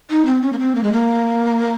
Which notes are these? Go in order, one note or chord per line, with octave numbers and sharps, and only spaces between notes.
D#4
C4
C#4
A#3
C4
A#3
G#3
A#3